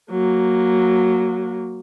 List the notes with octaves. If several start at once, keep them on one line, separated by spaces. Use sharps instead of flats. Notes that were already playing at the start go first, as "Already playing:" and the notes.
F#3 A#3